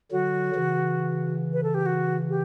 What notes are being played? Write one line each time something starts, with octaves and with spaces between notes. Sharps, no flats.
D3 F#3 F#4
C#3 E3
B4
A4
G4
F#4
G4